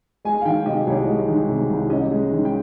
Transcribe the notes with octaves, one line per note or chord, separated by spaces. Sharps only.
G#3 G#5
F5
D#3 G5
C3 D#5
C2 C#5
G#3
D#3
C3
C2
C#4 D#5
G#3
D#3
G5